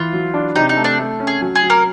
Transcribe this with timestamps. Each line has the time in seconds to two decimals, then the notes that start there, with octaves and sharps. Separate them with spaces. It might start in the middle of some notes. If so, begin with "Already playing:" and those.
Already playing: E3 F4
0.13 F#3
0.34 D4
0.56 C3 D#4
0.69 D#4
0.77 A3
0.84 D4
0.99 A3
1.20 C#4
1.27 G#4
1.41 F#3
1.55 G#4
1.63 F#3
1.70 A#3 A#4